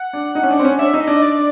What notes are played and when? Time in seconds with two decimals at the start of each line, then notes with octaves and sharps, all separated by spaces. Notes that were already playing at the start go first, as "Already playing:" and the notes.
Already playing: F#5
0.13 D4
0.35 D#4
0.43 C#4
0.50 D4
0.59 C4
0.65 C#4
0.79 D4 E5
0.94 D#4
1.00 D#5
1.08 D4
1.22 D5